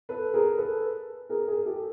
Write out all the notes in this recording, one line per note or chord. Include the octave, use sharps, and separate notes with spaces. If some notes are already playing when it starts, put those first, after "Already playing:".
A4 B4
G#4 A#4
A4 B4
G#4 A#4
G#4 A#4
G4 A4